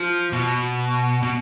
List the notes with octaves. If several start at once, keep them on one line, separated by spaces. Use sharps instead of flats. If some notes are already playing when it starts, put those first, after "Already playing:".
Already playing: F3
B2
B2